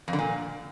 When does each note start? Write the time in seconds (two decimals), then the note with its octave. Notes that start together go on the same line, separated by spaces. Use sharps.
0.08 F2
0.13 D3
0.19 A#2